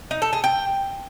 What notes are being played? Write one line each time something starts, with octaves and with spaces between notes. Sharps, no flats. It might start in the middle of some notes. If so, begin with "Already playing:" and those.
D#4
A4
G#4
G5